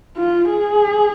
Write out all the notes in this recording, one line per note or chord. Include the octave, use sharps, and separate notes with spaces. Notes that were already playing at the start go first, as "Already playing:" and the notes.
F4
G#4